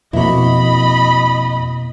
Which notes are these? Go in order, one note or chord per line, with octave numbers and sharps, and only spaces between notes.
F2 B2 A#3 E4 F#4 D#5 B5